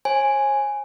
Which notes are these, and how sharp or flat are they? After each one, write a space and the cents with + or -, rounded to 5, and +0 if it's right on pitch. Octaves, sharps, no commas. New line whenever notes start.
C#5 -45 G#5 +0